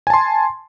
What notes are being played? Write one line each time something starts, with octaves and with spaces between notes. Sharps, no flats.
G#5 A5 C6